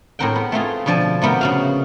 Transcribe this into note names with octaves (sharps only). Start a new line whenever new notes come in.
A2 G#3 C4 A#4 F#5 G5
B3
A3 C4 F4 G#4
B2 D3 F3 D5 G#5 A5
C3 A3 B3 A#4 G5
C#3 F#4 F5